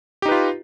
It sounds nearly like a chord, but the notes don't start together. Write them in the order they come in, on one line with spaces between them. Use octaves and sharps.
G4 D#4 B4 F4